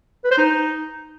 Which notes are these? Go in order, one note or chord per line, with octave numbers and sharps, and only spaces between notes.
B4
C5
D#4